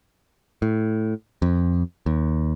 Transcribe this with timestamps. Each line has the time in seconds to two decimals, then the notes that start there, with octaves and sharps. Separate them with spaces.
0.62 A2
1.42 F2
2.06 D#2